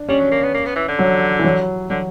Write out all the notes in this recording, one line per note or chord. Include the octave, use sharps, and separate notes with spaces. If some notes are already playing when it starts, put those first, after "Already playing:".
Already playing: D4
G3 C#4
F#3
A#3
B3
A#3
B3
E3
D3
F#3
E3
F#3
D3 F#3